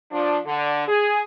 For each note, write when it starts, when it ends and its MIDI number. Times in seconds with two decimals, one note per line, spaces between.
0.12 0.38 53
0.12 0.38 62
0.45 0.83 50
0.87 1.22 68